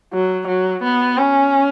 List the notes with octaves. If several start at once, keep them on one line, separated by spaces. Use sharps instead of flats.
F#3
F#3
B3
C#4